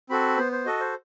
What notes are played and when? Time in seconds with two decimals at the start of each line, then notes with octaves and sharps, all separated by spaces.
0.10 C4 F#4 A4 B5
0.37 B3 C5
0.52 C5
0.65 F#4 A4 D#5
0.80 C5